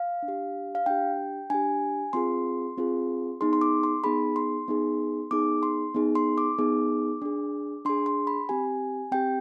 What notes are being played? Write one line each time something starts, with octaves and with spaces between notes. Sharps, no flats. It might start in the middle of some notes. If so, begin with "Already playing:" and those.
Already playing: F5
D4
G4
F5
D4 G4 G5
D4 G4 G#5
C4 F4 G#4 C6
C4 F4 G#4
B3 D#4 G#4 C6
C6
D6
C6
B3 D#4 G#4 B5
C6
B3 D#4 G#4
B3 D#4 G#4 D6
C6
B3 D#4 G#4
C6
D6
B3 D#4 G#4
D4 G#4
D4 G#4 C6
C6
B5
C4 G4 G#5
C4 G4 G5